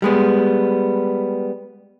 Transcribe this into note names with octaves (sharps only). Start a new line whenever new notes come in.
G3 G#3 B3